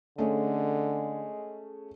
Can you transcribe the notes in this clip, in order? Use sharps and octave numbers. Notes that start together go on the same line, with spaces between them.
D3 G#3 A3 C#4 G#4